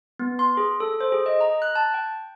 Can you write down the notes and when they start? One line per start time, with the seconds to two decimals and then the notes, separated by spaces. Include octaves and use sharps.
0.19 B3
0.39 C6
0.57 G#4
0.80 A4
1.01 C5
1.12 G#4
1.26 D#5
1.41 A#5
1.62 F#6
1.75 A5
1.94 G5